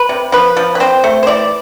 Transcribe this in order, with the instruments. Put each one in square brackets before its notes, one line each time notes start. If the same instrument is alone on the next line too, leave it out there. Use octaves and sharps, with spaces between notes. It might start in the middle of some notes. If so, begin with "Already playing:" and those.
Already playing: [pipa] B4
C3
F3 B4
F3
B4
C4 C5
A3
C5
E3 D5